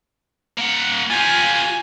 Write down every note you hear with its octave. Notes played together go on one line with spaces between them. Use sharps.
A#3 F#5
F4 G4 G#5